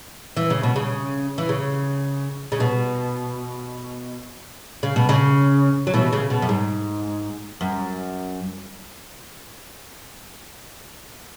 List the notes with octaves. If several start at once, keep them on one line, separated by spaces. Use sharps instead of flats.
E3
C#3
B2
C#3
E3
C#3
C#3
B2
C#3
B2
C#3
F#3
B2 E3
C#3
B2
F#2
G#2
F#2